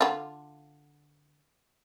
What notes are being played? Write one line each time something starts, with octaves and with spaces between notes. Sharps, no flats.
D3 F4